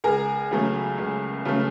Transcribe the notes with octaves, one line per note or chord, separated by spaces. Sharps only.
C#2 G#4 A#4
C#3 F#3 A3
C#2
C#3 F#3 A3